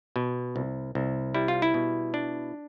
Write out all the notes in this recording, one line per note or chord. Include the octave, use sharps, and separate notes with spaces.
B2
C2
C2
G3 E4
F4
E4
B2
D4